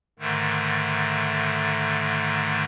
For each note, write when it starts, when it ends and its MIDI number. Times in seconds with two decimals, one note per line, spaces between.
0.19 2.64 44
0.19 2.64 50
0.19 2.64 51
0.19 2.64 57